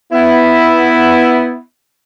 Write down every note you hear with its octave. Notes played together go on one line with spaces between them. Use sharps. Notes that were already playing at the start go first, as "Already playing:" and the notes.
B3 E4